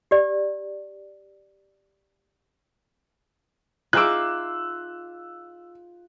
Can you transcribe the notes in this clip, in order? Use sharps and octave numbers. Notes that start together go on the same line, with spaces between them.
G4 D5
D#4 F4 G#4 E5 D6 E6 F#6